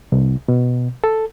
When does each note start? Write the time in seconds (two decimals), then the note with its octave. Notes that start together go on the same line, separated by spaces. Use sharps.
0.12 C2
0.48 B2
1.04 A4